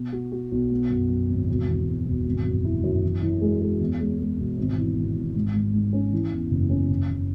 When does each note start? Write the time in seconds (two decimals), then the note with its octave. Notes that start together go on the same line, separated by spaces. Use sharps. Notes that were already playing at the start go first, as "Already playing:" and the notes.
Already playing: B2
0.12 F#4
0.32 F#4
0.52 B1
0.71 B3
0.90 F#2
1.10 F#2
1.29 G#1
1.48 E1
1.68 E2
1.87 E2
2.06 E1
2.26 G#1
2.45 F#2
2.65 E4
2.84 F#2
3.03 E3
3.22 E3
3.41 G#3
3.61 G#3
3.80 E2
3.99 G#3
4.19 G#3
4.38 E1
4.58 G#1
4.77 E3
4.96 G#1
5.16 G#1
5.35 G#2
5.54 G#2
5.73 G#2
5.93 C#4
6.12 E3
6.32 E2
6.51 F#1
6.70 C#4
6.90 F#1
7.09 F#1